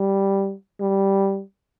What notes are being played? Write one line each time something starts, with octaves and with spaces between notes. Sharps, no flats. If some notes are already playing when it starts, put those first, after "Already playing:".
Already playing: G3
G3